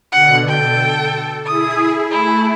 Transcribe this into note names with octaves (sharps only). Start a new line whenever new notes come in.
B2 D3 F#5
A4 G5
E4 G#4 D#6
A3 E4